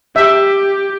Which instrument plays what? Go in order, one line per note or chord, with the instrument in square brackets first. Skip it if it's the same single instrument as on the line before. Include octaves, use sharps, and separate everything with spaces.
[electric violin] G4 [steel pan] E5